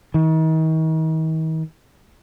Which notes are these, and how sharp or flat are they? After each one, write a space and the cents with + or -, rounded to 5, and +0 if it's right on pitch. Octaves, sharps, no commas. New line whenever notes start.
D#3 +40